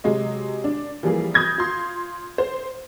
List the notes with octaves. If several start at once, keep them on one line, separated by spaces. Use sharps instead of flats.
C3 F#3 G#3 D#5
D4
E3 F3 G3 A#3 G#4
B5 D#6 G6 G#6 A#6
F4 C6
C5